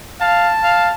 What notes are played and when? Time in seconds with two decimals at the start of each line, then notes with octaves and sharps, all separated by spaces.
0.21 F5 A5
0.63 F5